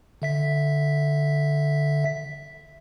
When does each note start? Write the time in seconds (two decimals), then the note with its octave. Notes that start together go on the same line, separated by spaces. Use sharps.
0.22 D3 E5 B6